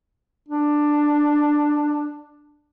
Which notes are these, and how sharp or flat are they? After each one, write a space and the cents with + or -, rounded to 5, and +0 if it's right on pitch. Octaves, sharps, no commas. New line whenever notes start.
D4 +10